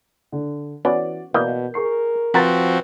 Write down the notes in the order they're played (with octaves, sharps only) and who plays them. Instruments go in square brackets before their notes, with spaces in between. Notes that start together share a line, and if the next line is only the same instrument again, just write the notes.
[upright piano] D3
[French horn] E3 [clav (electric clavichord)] B3 C#4 [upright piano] F#4 D5
[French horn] B2 [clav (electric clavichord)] E3 A#3 D#5 [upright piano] D5 G6
[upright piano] G#4 C#6 C7 [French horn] A#4
[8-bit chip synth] F3 C4 F#4 [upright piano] B4 A6 B6 [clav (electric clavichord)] F#5 A#5